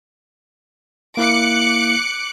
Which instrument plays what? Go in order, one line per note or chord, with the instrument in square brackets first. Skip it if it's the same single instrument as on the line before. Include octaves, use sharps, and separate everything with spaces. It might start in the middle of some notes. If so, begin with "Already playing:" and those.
[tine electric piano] A#3 E4 F5 [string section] D6 F#6 C#7